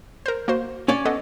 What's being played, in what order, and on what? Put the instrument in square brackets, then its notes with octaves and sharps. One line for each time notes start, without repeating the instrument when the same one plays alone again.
[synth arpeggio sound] A#4 C5
A#3 F#4 C5
[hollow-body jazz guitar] C#4 C#5 D5
[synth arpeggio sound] B3 A4 D#5